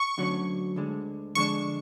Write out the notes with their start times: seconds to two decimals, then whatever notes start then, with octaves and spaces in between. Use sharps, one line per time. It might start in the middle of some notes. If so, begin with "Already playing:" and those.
Already playing: C#6
0.18 D2 D3 F#3 C#4
0.76 D2 D3 G#3
1.35 F2 D3 G#3 D4 C#6